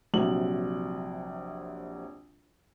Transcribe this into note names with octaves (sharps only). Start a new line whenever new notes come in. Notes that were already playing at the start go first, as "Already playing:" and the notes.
A#1 C3 F#3 F#7